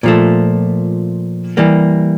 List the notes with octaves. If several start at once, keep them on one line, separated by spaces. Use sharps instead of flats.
A#2 F3 A3
E3 G3 A#3